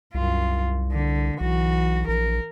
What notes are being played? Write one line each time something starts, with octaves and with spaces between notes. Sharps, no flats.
C2 F#2 F4
D3
B1 E3 F#4
A#1 A#4